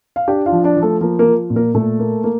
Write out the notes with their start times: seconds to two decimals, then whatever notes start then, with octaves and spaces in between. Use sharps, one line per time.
0.16 F5
0.28 D4 G4 G5
0.46 F4 F5
0.52 F3
0.64 D4 D5
0.77 F3
0.82 A3 A4
1.01 F3 A#3 A#4
1.19 A#3 A#4
1.26 F3
1.50 A#2
1.56 A#3 A#4
1.74 A#2 A3 A4
1.99 A#3
2.24 A#3